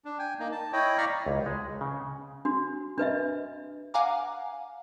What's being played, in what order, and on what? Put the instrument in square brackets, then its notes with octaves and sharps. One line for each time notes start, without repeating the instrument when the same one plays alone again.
[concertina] D4
G5 G#5
A#3 D#4
A5
E4 C#5 D#5 G5
D5 F5 A#5 B5 C#6 F6
[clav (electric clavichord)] C#2
G#3
C#3
[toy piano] D4 F#4
D4 B4 D#5 E5
[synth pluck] F5 F#5 G#5 A#5 D6